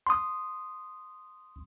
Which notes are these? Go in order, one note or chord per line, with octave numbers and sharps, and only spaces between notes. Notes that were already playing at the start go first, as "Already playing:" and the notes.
C6 D#6